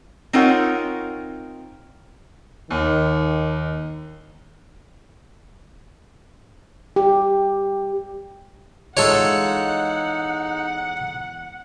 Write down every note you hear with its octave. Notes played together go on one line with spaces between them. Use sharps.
C4 D#4 F4 A#4 C#5 F#5
D#2 D#3
G4
E2 G#3 D#4 F4 A4 C#5 F#5